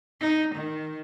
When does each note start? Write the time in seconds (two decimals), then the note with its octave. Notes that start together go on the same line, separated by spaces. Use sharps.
0.21 D#4
0.55 D#3